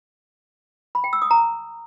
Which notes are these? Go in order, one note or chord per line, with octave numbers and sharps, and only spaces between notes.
B5
G5
E6
D#6
A#5